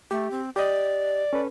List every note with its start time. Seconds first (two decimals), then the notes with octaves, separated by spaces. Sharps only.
0.11 A3 G4
0.31 C4
0.56 G4 D5 D#5
1.33 C#4 A4 B4